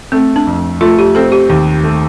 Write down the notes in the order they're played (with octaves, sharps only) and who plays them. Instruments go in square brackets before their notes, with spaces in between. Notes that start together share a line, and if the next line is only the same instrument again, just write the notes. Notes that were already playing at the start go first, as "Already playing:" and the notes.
[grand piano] A3 [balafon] C4
[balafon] D4
[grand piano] F2
[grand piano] A3 [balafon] F4
[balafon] G4
[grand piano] C4 [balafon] A4
[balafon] G4
[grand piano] D#2
A3